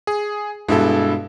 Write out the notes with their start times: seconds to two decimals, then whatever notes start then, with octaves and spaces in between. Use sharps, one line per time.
0.07 G#4
0.68 G2 B2 G#3 E4 A4